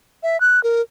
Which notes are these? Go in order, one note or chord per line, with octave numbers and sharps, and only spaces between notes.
E5
F#6
A#4